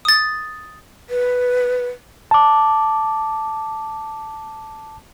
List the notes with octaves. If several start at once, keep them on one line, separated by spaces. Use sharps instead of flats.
D#6 A6
B4
A5 D6